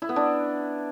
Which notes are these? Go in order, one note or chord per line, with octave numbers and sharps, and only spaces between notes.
E4
B3
D4